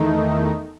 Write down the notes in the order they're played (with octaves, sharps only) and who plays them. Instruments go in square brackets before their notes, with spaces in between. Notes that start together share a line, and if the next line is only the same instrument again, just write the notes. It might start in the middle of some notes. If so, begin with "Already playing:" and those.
Already playing: [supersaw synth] E2 D#3 A3 D#4